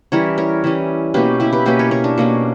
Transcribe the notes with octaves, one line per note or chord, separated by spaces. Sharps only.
E3 G3 C#4 A#4 C#5
A#4 C#5
E3 G3 C#4
B2 A#3 C#4 G4 B4
E4 G4
G4 B4
B2 A#3 C#4 G4 B4
A#4 C#5
A#4 C#5
D4
B2 A#3 C#4